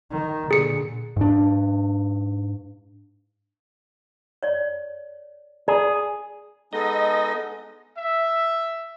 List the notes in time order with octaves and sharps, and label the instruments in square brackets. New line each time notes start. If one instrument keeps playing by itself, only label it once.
[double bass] D#3
[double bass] A#2 D3 [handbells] G#4 C#7
[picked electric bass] G#2 D4
[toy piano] C#5 D5
[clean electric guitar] G#4 [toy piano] D5
[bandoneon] G#3 B3 D#4 [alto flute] A4 [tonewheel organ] D#5
[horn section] E5